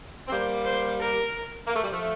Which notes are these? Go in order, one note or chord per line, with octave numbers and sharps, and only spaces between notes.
C4
G3 A#3 C5
C5
A#4
A#3
A3
G3
F3 A3